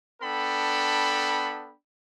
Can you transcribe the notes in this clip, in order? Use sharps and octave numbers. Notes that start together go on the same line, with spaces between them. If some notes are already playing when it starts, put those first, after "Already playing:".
B3 D4 A4 G5 B5